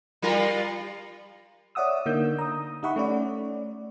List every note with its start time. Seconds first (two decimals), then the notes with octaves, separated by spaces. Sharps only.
0.22 G3 F4 A#4
1.75 C#5 D5 E5 F#5 D#6 E6
2.06 D3 A#3 D#4 E6 G6
2.39 A#5 D#6
2.83 D#4 G4 E5 F#5 B5 C#6
2.96 A3 C#4 D5